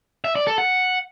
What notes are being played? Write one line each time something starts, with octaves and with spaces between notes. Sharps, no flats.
E5
D5
A4
F#5